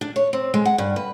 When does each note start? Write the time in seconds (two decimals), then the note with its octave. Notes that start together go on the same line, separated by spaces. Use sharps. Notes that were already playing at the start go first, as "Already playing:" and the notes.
0.01 D4
0.16 C#5
0.33 C4
0.54 G#3
0.65 F#5
0.78 G2
0.96 B4